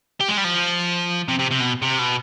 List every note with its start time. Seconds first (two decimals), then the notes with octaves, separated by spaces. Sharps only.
0.20 G4
0.28 G#3
0.37 G3
0.44 F3
1.29 C3
1.39 C3
1.51 C3
1.60 B2
1.82 C3
1.99 B2